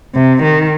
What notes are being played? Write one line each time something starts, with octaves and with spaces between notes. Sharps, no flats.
C3
D#3